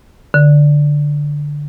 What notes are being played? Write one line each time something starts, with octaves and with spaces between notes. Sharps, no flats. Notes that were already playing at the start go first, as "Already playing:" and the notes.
D3